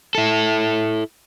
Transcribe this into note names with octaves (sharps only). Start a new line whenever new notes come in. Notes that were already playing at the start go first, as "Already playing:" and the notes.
E4 A4